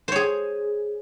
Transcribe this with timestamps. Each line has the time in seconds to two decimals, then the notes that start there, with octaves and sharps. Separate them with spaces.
0.08 C5
0.12 C#5
0.16 G#4